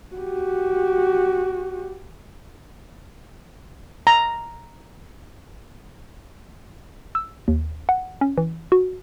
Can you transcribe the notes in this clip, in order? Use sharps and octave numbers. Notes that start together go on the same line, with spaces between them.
F#4 G4
A#5
E6
D#2
F#5
C#4
E3
F#4